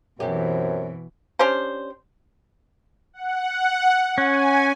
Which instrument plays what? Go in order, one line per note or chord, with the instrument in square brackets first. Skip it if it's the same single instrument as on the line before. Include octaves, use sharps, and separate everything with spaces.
[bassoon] F#2 [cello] B2 E3 [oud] C4 G4
[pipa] C#4 D4 G4 C5
[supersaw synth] F#5
[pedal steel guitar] C#4 [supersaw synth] G#5